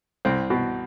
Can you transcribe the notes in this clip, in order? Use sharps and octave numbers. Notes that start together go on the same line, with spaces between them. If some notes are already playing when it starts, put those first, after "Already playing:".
C2 C4
B2